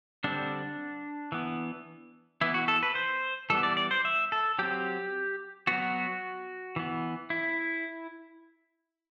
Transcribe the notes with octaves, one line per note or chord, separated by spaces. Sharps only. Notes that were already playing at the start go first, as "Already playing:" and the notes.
D3 G3 C4 D4
E3 B3
E3 B3 E4
F#4
A4
B4
C5
E3 G3 B3 A4
D5
D5
C5
E5
A4
F#3 C4 G4
F#3 B3 F#4
E3 B3
E4